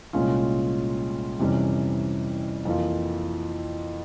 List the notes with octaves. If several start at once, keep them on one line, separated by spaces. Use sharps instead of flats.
C2 A#2 G#3 C#4 F4
F2 C3 E3 G3 C#4
F2 E3 A#3 F4